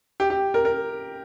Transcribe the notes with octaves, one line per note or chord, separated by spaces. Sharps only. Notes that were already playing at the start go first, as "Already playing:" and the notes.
G4
G4
A#4
A#4